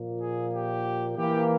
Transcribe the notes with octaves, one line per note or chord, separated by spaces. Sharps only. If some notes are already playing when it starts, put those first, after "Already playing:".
Already playing: A#2 F3 A#3
G#4
G4
E3 A#3 G4